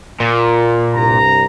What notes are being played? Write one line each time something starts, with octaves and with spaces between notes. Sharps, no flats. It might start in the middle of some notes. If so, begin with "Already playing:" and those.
A#2
C2 G2 A#5